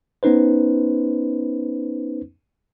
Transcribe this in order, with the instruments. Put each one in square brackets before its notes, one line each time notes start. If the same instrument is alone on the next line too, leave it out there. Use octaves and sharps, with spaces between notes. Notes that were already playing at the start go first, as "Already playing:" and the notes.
[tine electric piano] B3 C#4 D#4 B4 C5